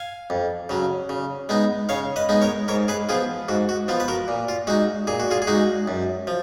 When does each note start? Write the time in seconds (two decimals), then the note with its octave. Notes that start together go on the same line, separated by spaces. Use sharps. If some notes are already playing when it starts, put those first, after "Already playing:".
Already playing: F5 G#5
0.30 F2
0.69 C#3 F#3
1.09 C#3
1.49 G#3 B3 D#4
1.89 C#3 C#5 F5
2.16 B4 D#5
2.29 G#3 B3 D#4
2.42 A#4 C#5
2.68 G#2 A#4 C#5
2.88 G#4 B4
3.09 F3 B3 F4 G#4
3.48 G#2 F#4
3.69 F#4
3.88 F3 B3 F4
4.00 B4
4.08 F#4 A#4
4.28 A#2
4.49 F4
4.67 G#3 F#4
4.70 D#4
5.07 A#2 G#4
5.20 F#4
5.31 F4 G#4
5.42 G#4
5.47 G#3 D#4 F#4
5.88 F#2
6.27 F3